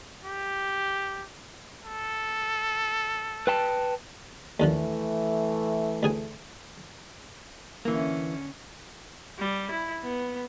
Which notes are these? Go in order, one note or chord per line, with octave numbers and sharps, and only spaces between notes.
G4
A4
B4 G5 A5
D#2 D3 E3 F3 A3
D2 G#4 G#5
D3 E3 A#3 C#4
G3
E4
B3